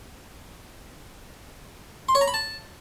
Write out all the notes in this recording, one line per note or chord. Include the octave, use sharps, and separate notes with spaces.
C6
C#5
A#5
B5
A5